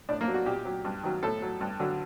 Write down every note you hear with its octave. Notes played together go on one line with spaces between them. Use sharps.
A2 D4
A#3
F#3
F#4
A#2 G4
F#3
G2
D#3 F#3
A2 A4
F#3
G2
D3 F#3